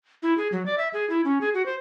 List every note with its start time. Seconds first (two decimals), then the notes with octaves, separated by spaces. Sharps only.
0.23 E4
0.38 G#4
0.52 F#3
0.66 D5
0.78 E5
0.93 G#4
1.10 E4
1.25 C#4
1.41 G#4
1.54 F#4
1.66 C5